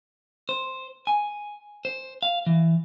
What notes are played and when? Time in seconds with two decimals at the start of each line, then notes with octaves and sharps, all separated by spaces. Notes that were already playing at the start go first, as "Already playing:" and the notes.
0.49 C5
1.07 G#5
1.85 C5
2.23 F5
2.47 E3